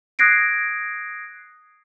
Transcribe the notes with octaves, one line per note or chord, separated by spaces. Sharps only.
D#6 F#6 G#6 A#6 C7 D7